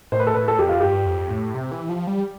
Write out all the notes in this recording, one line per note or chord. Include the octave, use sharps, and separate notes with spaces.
A2 C5
B4
A4
A2 B4
A4
F2 G4
F4
G2 G4
F2
A2
C3
E3
F3
G3